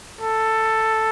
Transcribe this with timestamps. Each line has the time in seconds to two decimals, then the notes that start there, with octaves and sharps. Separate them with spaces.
0.21 A4